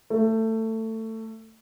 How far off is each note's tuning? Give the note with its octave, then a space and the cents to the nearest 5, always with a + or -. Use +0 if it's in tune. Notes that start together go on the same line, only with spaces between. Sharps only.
A3 +20